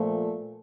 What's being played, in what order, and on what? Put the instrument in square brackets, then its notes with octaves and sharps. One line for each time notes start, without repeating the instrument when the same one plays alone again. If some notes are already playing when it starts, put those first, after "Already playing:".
Already playing: [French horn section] A#2 F3 A3